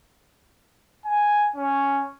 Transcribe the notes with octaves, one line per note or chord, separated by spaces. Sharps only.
G#5
C#4